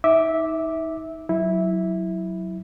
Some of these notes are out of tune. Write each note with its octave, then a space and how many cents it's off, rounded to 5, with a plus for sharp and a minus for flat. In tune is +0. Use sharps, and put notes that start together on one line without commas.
D#4 +30 E5 -15 D6 +0
F#3 +0 E4 -10